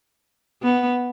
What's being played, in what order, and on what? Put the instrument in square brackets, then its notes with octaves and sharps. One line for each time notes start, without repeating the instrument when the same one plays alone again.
[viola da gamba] B3